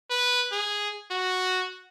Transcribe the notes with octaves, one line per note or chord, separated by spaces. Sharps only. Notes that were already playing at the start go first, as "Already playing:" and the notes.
B4
G#4
F#4